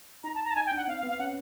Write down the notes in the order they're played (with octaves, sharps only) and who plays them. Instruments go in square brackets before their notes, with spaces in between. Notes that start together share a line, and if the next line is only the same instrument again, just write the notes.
[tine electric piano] D#4 [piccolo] A#5
[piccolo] A5
A#5
A5
[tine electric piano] D#4 [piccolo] G#5
[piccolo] G5
[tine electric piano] D4
[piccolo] F#5
[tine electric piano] C4 [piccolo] F5
[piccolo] F5
[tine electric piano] B3
[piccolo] F5
[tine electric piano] C#4 [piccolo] F#5